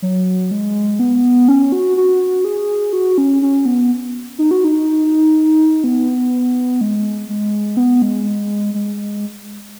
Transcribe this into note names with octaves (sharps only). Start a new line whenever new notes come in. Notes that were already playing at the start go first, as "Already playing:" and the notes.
F#3
G#3
B3
C#4
F#4
F#4
G#4
F#4
C#4
C#4
B3
D#4
F#4
D#4
B3
G#3
G#3
B3
G#3
G#3